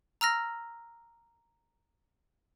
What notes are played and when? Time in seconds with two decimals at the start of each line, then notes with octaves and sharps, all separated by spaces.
0.21 A#5 E6 F6 A#6